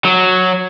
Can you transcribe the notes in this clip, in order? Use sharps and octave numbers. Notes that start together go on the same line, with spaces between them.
F#3